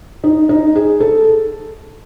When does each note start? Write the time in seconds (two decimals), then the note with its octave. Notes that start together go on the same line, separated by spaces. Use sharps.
0.24 D#4
0.49 D#4
0.76 G#4
1.00 A4